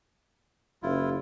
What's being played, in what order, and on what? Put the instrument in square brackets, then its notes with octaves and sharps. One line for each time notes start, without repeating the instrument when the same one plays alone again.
[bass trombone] F#1 [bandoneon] E4 F4